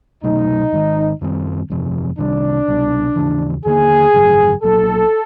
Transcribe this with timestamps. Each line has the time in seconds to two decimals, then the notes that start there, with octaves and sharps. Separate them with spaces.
0.23 C2 B2 F#3 A3 D#4
0.72 G#1 G#2 D#3
1.21 F#2 D#3 G3 C4
1.70 G1 F2 C3 F3
2.19 C2 C3 D#3 G3 D4
2.68 C2 B2 G3
3.16 D#2 C#3 E3
3.65 D#2 D3 G3 A#3 G#4
4.14 G#1 F#2 C#3 F#3
4.63 A#1 A#2 F#3 A4